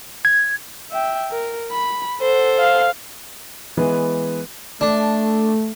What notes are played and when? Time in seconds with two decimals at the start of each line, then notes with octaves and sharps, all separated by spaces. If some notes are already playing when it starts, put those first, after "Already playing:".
0.25 G#6
0.91 E5 G5
1.31 A#4
1.72 B5
2.21 A4 C5 F#5
2.57 F5
3.77 E3 G#3 B3 G#4 B4
4.81 A3 D4